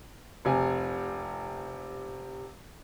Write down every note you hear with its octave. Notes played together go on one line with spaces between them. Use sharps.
F1 C3 G#5